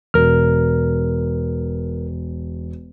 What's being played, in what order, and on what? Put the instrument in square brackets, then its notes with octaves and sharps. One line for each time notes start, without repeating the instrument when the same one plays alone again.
[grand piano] E1 [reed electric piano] A#4 F6